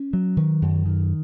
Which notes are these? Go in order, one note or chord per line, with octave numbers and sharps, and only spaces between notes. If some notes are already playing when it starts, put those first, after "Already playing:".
Already playing: C#4
F#3
D#3
F#2
D#3